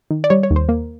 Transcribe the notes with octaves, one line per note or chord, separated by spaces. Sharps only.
D#3
D5
G3 C#5
C#5
D#2
C5
A#3